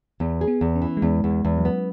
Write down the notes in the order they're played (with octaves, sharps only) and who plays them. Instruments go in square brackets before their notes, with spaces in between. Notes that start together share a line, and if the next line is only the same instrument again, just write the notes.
[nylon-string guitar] E2 [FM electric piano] B3
[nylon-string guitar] G#4
[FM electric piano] B3
[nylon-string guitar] E2
[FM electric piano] C#4
[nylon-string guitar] E3
[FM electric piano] G#3
[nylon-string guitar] E2 [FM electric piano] B3
[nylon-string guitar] E2
[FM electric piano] G#3
[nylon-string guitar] E2
[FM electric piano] F#3
[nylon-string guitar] B3